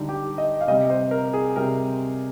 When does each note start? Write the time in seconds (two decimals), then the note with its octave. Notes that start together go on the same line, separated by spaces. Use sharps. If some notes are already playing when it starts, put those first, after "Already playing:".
Already playing: D3 G3 D#4
0.09 G4
0.38 D#5
0.61 F5
0.68 C3 G3 D#5
0.90 C5
1.11 A#4
1.33 G#4
1.56 C3 G3 A#4